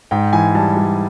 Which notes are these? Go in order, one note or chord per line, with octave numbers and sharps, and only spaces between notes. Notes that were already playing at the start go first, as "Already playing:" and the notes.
G#2 G5
E3 G#5
G3 A5
G3